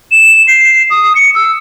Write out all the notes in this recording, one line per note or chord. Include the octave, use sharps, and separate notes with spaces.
E7
C7
D#6
C#7
E6